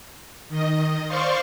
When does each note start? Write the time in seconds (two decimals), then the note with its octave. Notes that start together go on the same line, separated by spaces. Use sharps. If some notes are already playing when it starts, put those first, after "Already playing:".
0.49 D#3 D#5
1.08 C5 D5 F5 C6 C#6